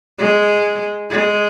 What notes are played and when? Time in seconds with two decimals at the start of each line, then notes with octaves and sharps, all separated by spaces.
0.19 G#3
1.10 G#3